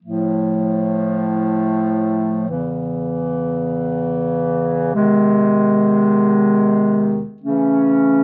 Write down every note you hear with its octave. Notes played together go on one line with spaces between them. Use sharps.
A2 F3 A3
E2 C#3 E3
E2 C3 D#3 G#3
C#3 E3 A3 C#4